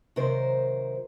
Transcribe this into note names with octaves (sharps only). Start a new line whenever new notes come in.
C3 D#3 F#3 A#4 C5